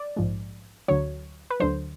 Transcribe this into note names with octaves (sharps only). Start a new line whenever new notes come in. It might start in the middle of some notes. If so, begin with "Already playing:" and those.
Already playing: D5
A#1 G#2 F3 G#3
D2 D3 F#3 C#5
B4
D2 D3 F#3 C5